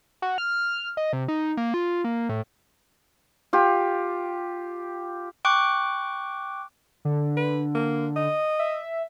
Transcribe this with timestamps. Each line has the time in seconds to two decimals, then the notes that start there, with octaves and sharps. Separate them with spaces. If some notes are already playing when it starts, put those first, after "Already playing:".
0.22 F#4
0.38 F6
0.97 D#5
1.13 C3
1.28 D#4
1.57 A#3
1.74 F4
2.04 A#3
2.29 A2
3.53 F4 G4
5.45 G5 C#6 D6 F#6
7.05 D3
7.37 B4
7.75 A#3
8.16 D#5
8.59 E5